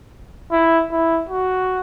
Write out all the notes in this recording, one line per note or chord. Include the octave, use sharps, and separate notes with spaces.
E4
E4
F#4